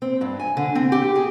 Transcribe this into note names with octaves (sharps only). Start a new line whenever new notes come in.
C4
G2
G#5
D3
C4
G4
G#4